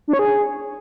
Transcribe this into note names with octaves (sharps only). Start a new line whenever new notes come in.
D4
C#5
G#4